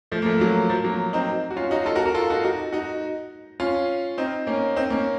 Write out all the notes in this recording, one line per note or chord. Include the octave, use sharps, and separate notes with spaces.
F3 A3
A#3
F3 A3
F#3 A#3
F3 A3
F#3 A#3
C4 D#4
F#4
C#4 F4
D#4 F#4
F4 A4
F#4 A#4
F#4 A#4
F4 A4
D#4 F#4
D#4 F#4
D#4 F#4
C#4 F4
C4 D#4
A#3 C#4
C4 D#4
A#3 C#4